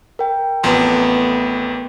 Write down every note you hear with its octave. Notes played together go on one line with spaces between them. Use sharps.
A#4 G5
A1 F2 A3 B3 C6